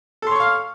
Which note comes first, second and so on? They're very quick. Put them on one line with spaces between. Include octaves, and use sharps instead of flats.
A4 C6 C#5 C#6 F5